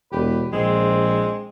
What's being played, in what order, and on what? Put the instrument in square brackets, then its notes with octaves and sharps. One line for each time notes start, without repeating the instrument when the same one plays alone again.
[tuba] E1 [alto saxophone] G4 [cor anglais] B4
[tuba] A#1 [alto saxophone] G#3 [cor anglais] C4